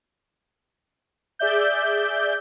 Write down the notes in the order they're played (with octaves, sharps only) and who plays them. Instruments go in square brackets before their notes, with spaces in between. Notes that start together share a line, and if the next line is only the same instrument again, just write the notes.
[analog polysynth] G#4 D5 E5 G6